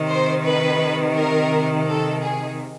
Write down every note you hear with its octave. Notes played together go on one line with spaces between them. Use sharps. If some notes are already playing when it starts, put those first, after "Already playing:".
Already playing: C3 D#3
C5
B4
A#4
A4
G#4